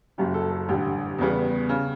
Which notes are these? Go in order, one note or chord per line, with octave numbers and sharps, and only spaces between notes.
F#1 F#2 C#3 G4
A4
A4
A1 G2 D3 G4
E2 C#3 G3 B3
C#3